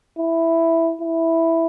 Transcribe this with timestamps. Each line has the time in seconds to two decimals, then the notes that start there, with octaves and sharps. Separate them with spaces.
0.18 E4
1.01 E4